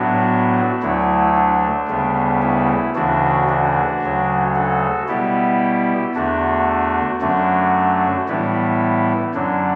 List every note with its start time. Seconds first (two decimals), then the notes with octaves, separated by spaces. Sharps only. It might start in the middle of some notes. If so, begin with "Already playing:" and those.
Already playing: A2 F#3 B3 D4 F#4
0.82 D2 D3 F#3 A3 E4
1.35 D4
1.88 D2 C#3 G3 B3
2.42 E4
2.95 D2 C#3 E3 D4 F#4
3.49 D4 F#4
4.02 D2 C#3 F#3
4.55 F#4 A4
5.08 B2 G3 B3 E4 G4
6.15 E2 D3 A3 D4 F#4
7.21 F#2 D3 F#3 A3 D4 F#4
8.28 A2 E3 G3 B3 E4
9.35 F#2 D3 F#3 D4